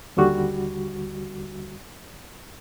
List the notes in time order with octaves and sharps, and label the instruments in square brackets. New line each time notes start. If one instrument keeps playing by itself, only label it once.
[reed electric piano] D#2 D3 G3 F#4